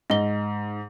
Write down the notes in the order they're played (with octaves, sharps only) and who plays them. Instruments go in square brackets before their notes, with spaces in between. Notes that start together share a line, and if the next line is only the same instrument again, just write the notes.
[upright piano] G#2 [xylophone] D#5 G7